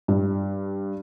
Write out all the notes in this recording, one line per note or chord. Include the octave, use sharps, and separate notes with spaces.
G2